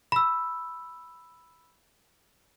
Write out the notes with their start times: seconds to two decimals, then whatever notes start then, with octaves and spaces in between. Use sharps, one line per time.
0.12 B5 E6